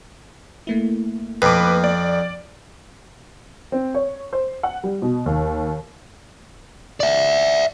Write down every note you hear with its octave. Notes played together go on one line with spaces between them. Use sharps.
A3 A#3 E4
F2 B4 D6
D5
C4
C#5
C5
F#5
G3
B2
D#2
D5 E5